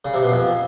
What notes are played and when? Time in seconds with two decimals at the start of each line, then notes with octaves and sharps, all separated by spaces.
0.05 C#3
0.14 C3
0.23 B2
0.32 F2